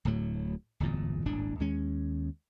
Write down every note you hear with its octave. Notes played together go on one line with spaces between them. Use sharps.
D1 D2 A2 F#3
D1 G1 E2 A#2
D#1 G#1 A2 D4
D#2 G#3 C#4